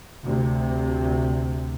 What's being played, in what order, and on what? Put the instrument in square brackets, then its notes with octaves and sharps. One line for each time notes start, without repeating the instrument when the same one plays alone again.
[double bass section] D2 C3